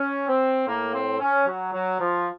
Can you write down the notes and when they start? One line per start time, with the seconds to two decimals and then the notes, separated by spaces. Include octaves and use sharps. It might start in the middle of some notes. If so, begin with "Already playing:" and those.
Already playing: C#4
0.28 C4
0.67 A2 A#3
0.94 C4
1.20 C#4
1.47 F#3
1.73 F#3
1.99 F3